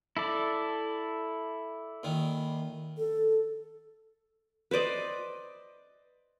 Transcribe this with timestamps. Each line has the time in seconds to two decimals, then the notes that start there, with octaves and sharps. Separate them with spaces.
0.17 E4 A4 D5
2.03 A#2 D#3
2.97 A4
4.71 B4 C5 D5 D#5